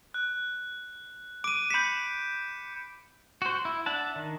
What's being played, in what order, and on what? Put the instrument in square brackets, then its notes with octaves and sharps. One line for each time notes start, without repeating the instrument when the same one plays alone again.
[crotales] F#6
[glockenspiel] D6 D#7 [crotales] D7
[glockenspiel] B5 B6 [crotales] G6 C#7 E7
[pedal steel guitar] F#4 C5
E4
D4 E5 F#5 A5
D#3